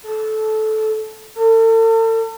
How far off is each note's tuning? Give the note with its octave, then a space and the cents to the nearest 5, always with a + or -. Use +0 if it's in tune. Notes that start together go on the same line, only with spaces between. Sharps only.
A4 -15
A4 +40